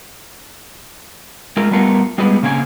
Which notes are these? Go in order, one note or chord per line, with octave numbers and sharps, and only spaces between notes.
G#3 A3 F4 A#4
G3 A3 B3 F4 A4 A#4
G3 G#3 B3 F4 G#4 B4
C#3 A#3 C4 C#4 G#5